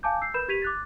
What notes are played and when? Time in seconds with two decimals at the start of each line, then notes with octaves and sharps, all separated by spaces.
0.03 F5 G#5 A5 D6 G6
0.21 E6 G6 C7
0.34 A#4 B4 B5 G6 E7
0.48 G4 G#6 B6 D#7 F7
0.62 D6 F#6 A6